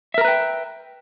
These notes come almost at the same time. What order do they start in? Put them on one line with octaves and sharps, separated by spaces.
E5 A#4 A#5 B4 G5